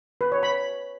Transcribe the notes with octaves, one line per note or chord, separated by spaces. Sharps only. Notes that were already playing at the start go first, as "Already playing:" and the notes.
B4
C#5
B5